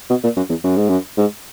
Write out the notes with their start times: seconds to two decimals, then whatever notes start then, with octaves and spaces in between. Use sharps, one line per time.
0.10 B2
0.23 A#2
0.36 F#2
0.49 E2
0.64 F#2
0.76 G#2
0.88 F#2
1.17 G#2